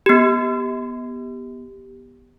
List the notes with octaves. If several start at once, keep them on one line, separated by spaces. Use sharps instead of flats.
B3 G4